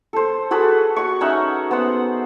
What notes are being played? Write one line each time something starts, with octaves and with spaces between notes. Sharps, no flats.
A4 C5
F#4 G#4 A4 B4
F#4 C#6
C#4 D#4 E5 F#5
B3 C5 F#5